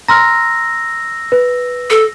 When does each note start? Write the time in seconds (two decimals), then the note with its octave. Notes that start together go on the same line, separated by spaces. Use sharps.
0.08 A#5 C6 E6 F6 A#6
1.32 B4
1.90 A4